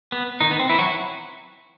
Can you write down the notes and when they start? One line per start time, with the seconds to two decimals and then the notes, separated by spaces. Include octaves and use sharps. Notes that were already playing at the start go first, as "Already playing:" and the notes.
0.12 B3
0.41 D#3 D#4
0.51 B3
0.59 C4
0.69 E3 E4
0.78 F#3 F#4